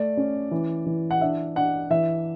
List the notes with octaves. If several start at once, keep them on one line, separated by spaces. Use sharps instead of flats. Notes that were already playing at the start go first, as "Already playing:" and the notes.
Already playing: A3 D5
C#4
E3
E3
F#5
D4 E5
D4 F#5
E3 E5